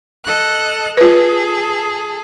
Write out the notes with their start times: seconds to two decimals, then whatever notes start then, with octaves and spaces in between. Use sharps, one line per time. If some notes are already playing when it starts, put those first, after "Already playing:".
0.25 A4 D#5 F#6
0.97 F4 G#4 A4 B4